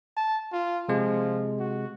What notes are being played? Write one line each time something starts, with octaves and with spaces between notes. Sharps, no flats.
A5
F4
C3 F3 G#3
F#4